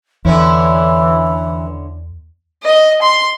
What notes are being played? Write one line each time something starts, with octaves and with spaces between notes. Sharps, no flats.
E2 D3 E3 C#4 E4
D#5
C6